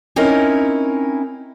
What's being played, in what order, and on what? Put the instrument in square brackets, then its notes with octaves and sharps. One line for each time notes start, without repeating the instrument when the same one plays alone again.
[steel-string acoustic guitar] C4 C#4 D#4 E4 A#4